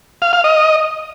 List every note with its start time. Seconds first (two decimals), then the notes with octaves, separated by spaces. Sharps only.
0.22 F5
0.33 F5
0.44 D#5